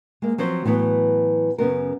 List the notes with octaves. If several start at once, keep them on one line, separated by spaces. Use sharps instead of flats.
G#3 A#3
F3 F#3 C4 C5
A2 E3 F#3 B3
F#2 C#3 B3 A#4